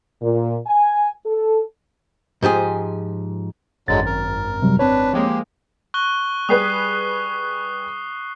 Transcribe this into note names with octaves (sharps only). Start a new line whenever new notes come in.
A#2
G#5
A4
G#2 F3 G4 G#4
G#1 F#2 D3 F#3 G#3 A6
A#4
C3 F#3 G3
C4 D4 B4 C#5
F3 G#3 A#3 G4
C#6 F#6 G7
G3 G#4 B4 D#6 C7